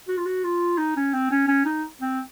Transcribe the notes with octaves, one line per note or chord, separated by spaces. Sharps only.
F#4
F4
F#4
F4
D#4
C#4
C4
C#4
C#4
D#4
C4